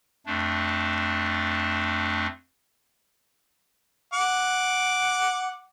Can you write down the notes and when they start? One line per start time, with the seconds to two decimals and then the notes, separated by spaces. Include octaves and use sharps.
0.26 F2 A3 D4
4.13 F#5 D6